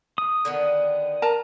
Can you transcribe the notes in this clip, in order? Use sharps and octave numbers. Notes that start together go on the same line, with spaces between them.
D#6
D3 D#3 B3
A#4 A5 A#5